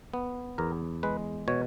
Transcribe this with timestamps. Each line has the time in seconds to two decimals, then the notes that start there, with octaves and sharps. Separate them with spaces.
0.14 B3
0.58 E2 A#4
1.03 G#3 B4
1.48 B2 C#5